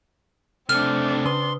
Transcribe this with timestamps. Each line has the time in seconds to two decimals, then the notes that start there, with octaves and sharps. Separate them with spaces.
0.69 C3 A3 C4 D4 F6
1.25 C#3 B4 C6 D#6